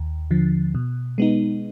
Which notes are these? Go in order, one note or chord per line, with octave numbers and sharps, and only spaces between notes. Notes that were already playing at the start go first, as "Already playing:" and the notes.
Already playing: D#2
D3 F3
B2
G#3 B3 D#4